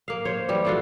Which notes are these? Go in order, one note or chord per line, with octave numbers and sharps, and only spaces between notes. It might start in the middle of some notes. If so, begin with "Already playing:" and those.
A#3 F5
C5 C#5
E3 G3
A3 F4 F#4